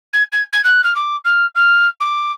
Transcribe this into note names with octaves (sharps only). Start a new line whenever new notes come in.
G#6
G#6
G#6
F#6
F6
D6
F6
F6
D6